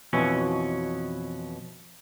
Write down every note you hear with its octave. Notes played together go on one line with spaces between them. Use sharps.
F2 B2 E3 C#4